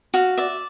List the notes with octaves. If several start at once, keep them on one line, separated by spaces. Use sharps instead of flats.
F#4 F5
D5 E5